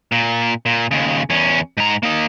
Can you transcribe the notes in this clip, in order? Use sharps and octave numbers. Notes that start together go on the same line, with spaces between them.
A#2
A#2
D#2 C#3
E2 C#4
G#2 A#5
A#3 D#4